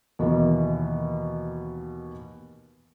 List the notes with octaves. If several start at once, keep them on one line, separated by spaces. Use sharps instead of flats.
D#2 B2 E3 A#3